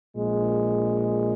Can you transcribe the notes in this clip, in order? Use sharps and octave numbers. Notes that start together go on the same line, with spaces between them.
A#1 A#2 G#3